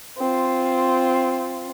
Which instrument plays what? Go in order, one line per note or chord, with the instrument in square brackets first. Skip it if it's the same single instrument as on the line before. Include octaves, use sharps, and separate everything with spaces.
[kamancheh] C4 F4